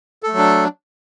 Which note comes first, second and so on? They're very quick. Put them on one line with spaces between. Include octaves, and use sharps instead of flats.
A4 A3 F#3 D4